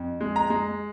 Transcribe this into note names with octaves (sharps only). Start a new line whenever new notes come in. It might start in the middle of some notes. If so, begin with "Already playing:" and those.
Already playing: F2
G#3
A#5
G#3